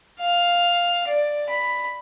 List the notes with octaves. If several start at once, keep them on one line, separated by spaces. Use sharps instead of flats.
F5
D5
B5